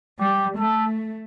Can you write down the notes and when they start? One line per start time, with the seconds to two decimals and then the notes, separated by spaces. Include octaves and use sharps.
0.19 G3 G4
0.58 A3 A4